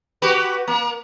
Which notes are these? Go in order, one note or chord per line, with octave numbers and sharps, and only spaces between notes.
F#4 G4 B4
A#3